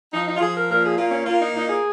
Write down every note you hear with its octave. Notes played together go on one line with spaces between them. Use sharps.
F3 D#4
D#4
F4
F3 G#4
A#4
A#2 A#4
G#4
A#3 F4
C#4
A#3 F4
D#4
A#2 D#4
G#4